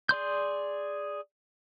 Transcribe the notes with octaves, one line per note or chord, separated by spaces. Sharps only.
G#4 D5 C6 G6